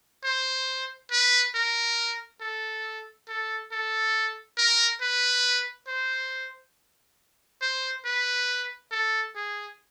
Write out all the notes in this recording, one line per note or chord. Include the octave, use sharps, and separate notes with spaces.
C5
B4
A#4
A4
A4
A4
A#4
B4
C5
C5
B4
A4
G#4